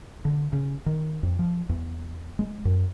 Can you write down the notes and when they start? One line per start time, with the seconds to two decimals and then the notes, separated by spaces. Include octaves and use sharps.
0.25 D3
0.53 C#3
0.86 D#3
1.23 F2
1.39 F3
1.69 E2
2.39 G#3
2.65 F#2